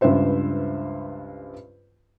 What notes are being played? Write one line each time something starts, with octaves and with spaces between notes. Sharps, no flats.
C#2 G2 B4 C5 E5